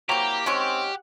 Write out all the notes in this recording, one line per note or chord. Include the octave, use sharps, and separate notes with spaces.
C3 F#3 A#3 E4 G4 G5 A#5
D#3 G#3 C4 C#4 F#5